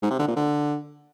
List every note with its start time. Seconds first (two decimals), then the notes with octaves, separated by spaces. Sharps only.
0.02 G#2
0.11 C3
0.19 D3
0.28 A#2
0.37 D3